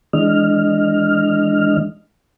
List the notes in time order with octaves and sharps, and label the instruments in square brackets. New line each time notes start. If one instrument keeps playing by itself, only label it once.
[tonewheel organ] E3 G#3 D4 D#5 F6